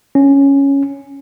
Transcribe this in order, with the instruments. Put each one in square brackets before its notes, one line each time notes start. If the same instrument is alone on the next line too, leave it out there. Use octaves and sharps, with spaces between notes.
[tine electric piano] C#4